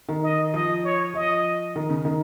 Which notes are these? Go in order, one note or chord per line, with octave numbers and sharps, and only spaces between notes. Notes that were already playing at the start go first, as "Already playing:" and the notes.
D#3
D#5
F3 D#5
C#5
F3 D#5
D#3
C#3
D#3